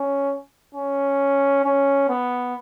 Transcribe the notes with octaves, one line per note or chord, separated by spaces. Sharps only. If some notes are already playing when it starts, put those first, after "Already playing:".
Already playing: C#4
C#4
C#4
B3